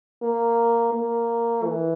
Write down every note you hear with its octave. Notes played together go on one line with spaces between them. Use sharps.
A#3
A#3
E3